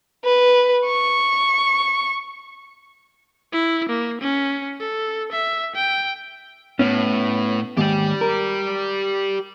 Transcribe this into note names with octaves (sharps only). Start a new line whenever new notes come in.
B4
C#6
E4
A#3
C#4
A4
E5
G5
A2 B3 C#4
D#2 G#2 G4 D5
A#4